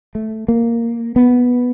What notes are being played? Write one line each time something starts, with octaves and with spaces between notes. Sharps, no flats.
A3
A#3
B3